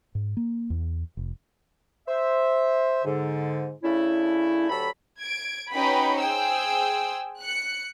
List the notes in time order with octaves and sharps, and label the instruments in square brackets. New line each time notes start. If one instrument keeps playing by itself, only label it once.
[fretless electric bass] G#2
A#3
E2
F1
[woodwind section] C5 E5
G#2 D3
C#3 A3 C#4 D4 E4
D2 F#3 G4 A4 B5
[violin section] G#6 D7
C#4 D#4 F#4 B4 G5 B5
G#4 C5 G5 E6
F#6 C#7